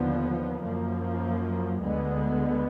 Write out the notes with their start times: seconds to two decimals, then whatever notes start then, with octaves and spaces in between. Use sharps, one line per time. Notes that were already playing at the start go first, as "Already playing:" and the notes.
Already playing: D#2 D3 F3 B3
0.64 F#2 F3 A#3
1.82 D2 D3 G#3 B3